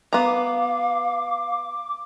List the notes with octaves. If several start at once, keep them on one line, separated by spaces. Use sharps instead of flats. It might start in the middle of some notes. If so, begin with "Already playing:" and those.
B3 F5 A#5 D6